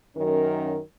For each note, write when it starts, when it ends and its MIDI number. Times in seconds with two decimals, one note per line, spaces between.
0.16 0.79 42
0.16 0.79 51
0.16 0.79 54
0.16 0.79 61
0.16 0.79 70